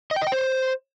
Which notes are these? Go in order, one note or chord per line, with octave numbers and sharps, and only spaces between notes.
D#5
G5
D#5
G5
C5